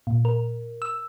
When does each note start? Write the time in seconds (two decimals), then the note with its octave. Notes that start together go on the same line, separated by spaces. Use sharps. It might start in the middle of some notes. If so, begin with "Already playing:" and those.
0.07 A#2
0.25 A#4
0.82 E6